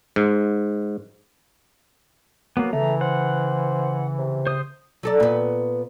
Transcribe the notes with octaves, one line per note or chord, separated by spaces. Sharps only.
G#2
F#3 A#3 B3
C#3 E3 A3 A#5
C5 F#5
C3
C5 D#6
F#3 A4 D5
A#2 B3